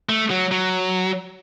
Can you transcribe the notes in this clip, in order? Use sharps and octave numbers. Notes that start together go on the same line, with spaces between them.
A3
F#3
F#3